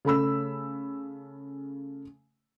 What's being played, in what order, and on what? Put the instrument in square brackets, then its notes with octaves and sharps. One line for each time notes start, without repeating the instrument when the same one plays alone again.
[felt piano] C#3 A3 B5 E6